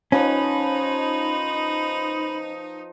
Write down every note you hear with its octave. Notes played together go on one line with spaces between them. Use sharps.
F3 C#4 D#4 B4 D#5 B5